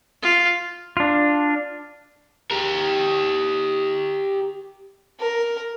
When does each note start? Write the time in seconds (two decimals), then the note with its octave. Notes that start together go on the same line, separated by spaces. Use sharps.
0.23 F4
0.97 D4 F4
2.51 G4 A#4
5.20 A#4